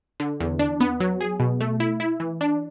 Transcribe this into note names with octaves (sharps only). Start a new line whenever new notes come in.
D3
E2
D4
B3
F#3
G#4
B2
A3
E4
E4
E3
D4